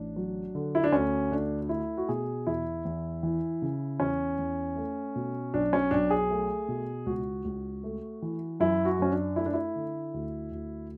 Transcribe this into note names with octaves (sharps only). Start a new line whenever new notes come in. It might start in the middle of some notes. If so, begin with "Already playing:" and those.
Already playing: A1 D4
F#3
D3
E4
D4
D2 C#4
A3 D4
D4
A3 E4
F#4
B2 G#4
E2 E4
E2
E3
C#3
E2 C#4
E2
A3
B2
B1 D4
C#4
B1 D4
G#4
A3
B2
C#2 F#4
C#2
A3
E3
F#2 E4
F#4
F#2 C#4
D4
A3 E4
D4
E4
D3
D2
D2